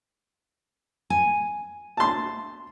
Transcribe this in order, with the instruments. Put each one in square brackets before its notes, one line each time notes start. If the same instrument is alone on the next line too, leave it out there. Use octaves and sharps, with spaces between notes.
[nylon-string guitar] G#5
[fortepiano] A5 C6